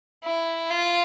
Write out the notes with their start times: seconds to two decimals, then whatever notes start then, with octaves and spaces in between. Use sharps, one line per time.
0.24 E4
0.70 F4